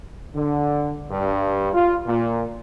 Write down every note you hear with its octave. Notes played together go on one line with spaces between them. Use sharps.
D3
G2
F4
A#2